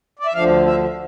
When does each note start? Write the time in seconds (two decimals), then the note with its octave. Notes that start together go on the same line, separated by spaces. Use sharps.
0.19 D5
0.26 E5
0.34 D2 D3 F3 F5
0.66 E5